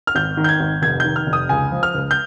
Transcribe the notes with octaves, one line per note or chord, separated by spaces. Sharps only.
F6
G#1 G6
D#3
G6
G#6
G#1
F1 G#6
D#3 G6
F6
F1
D#6
C#2 G#5
F3
F6
C#2
G6